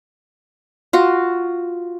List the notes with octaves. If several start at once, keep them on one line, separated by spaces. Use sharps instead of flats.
F4 F#4